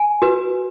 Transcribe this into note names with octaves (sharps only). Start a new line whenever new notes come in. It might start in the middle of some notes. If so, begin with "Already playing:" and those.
Already playing: G#5
F#4 B4